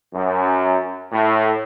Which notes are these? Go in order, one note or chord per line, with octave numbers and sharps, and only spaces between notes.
F#2
A2